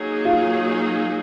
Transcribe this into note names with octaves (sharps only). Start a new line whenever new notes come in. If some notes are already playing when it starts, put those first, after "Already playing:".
Already playing: F#3 A#3 D#4 G#4
F4